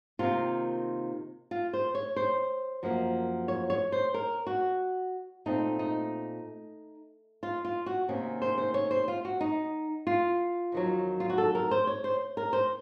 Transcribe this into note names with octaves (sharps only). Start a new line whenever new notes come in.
C3 D#3 A#3 F4
F4
C5
C#5
C5
F#2 F3 A#3
C#5
C#5
C5
A#4
F#4
A#2 A3 C4 D#4
D#4
F4
F4
F#4
C3 D#3 A#3 C#4
C5
C5
C#5
C5
F4
F#4
D#4
F4
F2 D#3 F#3
F4
F#4
A4
A#4
C5
C#5
C5
A#4
C5